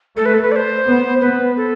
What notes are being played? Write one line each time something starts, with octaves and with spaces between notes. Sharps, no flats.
A3 A4
B4
A4
B4
D5
C5
B3
B3 B4
A4